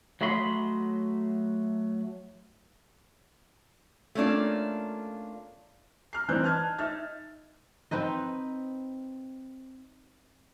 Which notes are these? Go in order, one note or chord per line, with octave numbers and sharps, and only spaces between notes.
F#3 A3 F#4 D#5 B5 C6
A3 A#3 C#4 D4 F4
A#5 F6 C7
E3 C4 D#4 D5 F#6 G6
D#5 A5 F6 G#6
D#4 E5 F6 A6
C4 D#4 B4 D#5